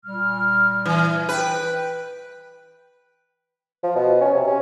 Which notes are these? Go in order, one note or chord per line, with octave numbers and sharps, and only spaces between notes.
A#2 G3 F6
E3
B4 G5
F3
B2
C#4
C3
C#4